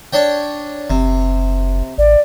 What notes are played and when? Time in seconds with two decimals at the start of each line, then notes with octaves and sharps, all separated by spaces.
0.13 D4 C#5 G5
0.90 F#1 C3
1.98 A1 D5